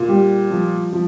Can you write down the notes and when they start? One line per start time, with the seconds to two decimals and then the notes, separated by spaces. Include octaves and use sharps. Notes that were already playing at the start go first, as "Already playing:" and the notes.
Already playing: A#2
0.08 G3
0.51 F3
0.93 F3